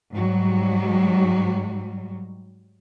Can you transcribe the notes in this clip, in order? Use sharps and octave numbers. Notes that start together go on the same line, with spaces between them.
G#2 F#3 G3